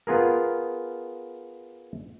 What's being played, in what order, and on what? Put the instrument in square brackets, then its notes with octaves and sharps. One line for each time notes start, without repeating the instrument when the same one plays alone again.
[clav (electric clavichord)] B3 F4 G#4 A#4